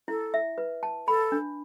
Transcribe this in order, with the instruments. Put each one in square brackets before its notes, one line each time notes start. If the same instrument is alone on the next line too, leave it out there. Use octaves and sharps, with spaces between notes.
[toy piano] E4 [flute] A4
[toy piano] E5
B4
A5
[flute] A4 [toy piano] B5
[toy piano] D4